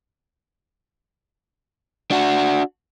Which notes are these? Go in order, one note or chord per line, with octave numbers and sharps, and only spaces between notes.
D4 F#4